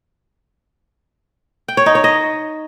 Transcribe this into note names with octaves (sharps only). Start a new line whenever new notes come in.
G5
C#5
D#4
C#5
D#5